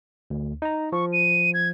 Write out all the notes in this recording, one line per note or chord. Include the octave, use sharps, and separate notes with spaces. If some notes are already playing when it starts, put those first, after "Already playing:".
D2
D#4 A#5
F3 C#6
D#7
G#6